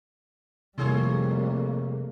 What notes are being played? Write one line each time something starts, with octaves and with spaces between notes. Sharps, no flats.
F2 C3 D#3 G3 A3 A#3 G#4 C#5